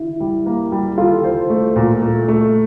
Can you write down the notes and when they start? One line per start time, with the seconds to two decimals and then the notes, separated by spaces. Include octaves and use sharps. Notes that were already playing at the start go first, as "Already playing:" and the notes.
Already playing: E4
0.20 G3
0.46 A#3
0.72 G3
0.98 F4 A4
1.24 C5
1.50 A3
1.76 A#2
2.02 A3
2.28 A3